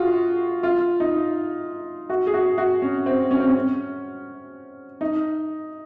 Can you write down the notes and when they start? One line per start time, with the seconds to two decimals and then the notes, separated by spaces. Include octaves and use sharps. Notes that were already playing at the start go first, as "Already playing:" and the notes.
Already playing: F4 F#4 G#4
0.63 F4
1.00 D#4
2.10 F#4
2.27 G#4
2.34 F#4
2.58 F#4
2.82 C#4
3.06 C4
3.31 C#4
3.40 C4
3.49 C#4
5.01 D#4